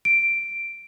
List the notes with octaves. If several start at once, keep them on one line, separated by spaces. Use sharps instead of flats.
D7